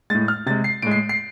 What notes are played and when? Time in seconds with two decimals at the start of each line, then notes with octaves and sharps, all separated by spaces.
0.10 G#3 A6
0.15 A2
0.28 F6
0.46 C3 A6
0.50 G#3
0.64 C7
0.82 A2 G#3 D7
0.91 C7
1.09 C7